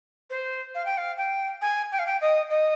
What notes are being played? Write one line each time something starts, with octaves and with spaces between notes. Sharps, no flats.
C5
F5
G5
F5
G5
G#5
G5
F5
G5
D#5
D#5